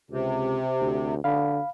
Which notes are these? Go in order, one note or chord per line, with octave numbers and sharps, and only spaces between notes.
C#2 C3
D2
D3 F5 B5